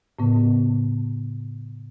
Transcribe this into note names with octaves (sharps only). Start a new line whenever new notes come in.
A2 C#3 B3